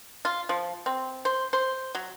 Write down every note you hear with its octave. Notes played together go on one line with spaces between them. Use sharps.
F4
F3
C4
C5
C5
F#3